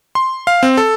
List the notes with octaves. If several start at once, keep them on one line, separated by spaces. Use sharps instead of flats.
C6
F5
C4
A4